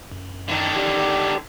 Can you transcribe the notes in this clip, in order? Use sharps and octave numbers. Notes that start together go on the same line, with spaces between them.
F#2
D3 D#3
G4 D5 D6